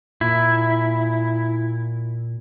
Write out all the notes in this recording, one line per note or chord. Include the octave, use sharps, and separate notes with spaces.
A#2 E4